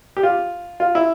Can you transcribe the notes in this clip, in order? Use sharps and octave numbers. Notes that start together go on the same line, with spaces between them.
G4
F4
F4
E4